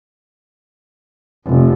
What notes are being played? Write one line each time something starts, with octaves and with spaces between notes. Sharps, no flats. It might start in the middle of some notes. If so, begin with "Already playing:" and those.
F1